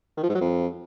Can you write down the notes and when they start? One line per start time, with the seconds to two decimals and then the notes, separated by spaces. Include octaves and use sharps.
0.17 D#3
0.23 F3
0.29 G#2
0.35 F#3
0.41 F2